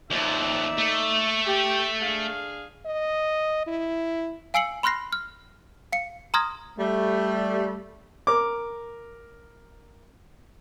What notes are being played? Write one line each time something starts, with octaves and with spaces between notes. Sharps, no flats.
D#2 F3 D#4 D5 E5
A3
G4
D4 G#4 F5
D#5
E4
F5 G#5 E6 C7 C#7 F#7
B5 C6 F6 F#6 A#6 C7
F6
F5 C#7
A#5 C6 D#6 F6 G#6 A#6
G3 A3
A#4 D6